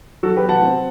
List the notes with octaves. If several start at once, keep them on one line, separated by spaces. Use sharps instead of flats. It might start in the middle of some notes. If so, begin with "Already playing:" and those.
F#3 F#4 A4
G4 B4
B3
F#5 A5
C4